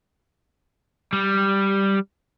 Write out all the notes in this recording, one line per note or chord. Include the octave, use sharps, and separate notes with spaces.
G3